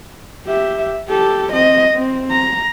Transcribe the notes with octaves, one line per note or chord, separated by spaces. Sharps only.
G4 E5
G4 A4
C4 D#5
C4
A#5